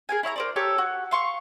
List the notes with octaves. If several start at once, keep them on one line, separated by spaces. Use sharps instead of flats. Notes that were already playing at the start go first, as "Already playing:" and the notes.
G#4 A#4 G#5
E4 C#5 E5 A#5
A#4 C5 D5
G4 A4 A#4 C#5
F#4
F5 C6 C#6